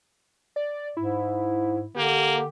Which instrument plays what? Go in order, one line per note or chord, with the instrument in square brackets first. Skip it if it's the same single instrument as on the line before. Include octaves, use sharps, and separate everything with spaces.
[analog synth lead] D5
[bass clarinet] G#2 [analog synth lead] E4
[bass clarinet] D3 [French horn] A#3 [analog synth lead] G4